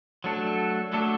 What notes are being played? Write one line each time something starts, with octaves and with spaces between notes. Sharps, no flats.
F#3 A3 D4 A4
F#3 A3 D4 A4